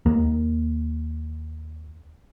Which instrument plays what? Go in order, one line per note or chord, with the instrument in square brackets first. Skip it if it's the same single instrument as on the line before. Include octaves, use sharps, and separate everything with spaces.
[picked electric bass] D#2 A#3